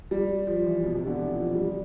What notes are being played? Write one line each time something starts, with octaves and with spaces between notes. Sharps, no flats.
G3
F3
E3
B2
C3
D3
E3
F3
F3
G3